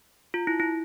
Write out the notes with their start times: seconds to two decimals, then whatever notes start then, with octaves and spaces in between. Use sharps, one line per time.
0.34 F4
0.47 E4
0.60 E4